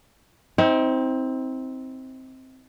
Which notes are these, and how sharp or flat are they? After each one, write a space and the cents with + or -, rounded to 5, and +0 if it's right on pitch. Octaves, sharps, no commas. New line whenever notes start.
C4 +0 D#4 +40